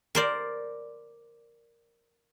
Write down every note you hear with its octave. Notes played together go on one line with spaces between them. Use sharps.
A#4 C5 D5